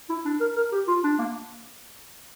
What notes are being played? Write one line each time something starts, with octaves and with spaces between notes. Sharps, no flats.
E4
D4
A#4
A#4
G4
F4
D4
A#3